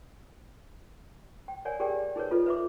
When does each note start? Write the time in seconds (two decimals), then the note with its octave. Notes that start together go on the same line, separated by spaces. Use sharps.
1.48 G5
1.65 A#4 C#5 D5 F#5 G#5
1.80 G4 G#4 A#4 D5 G5
2.16 D#4 G#4 A#4 B4 C#5
2.31 F4 A4 B4 D#5
2.46 B4 E5 D6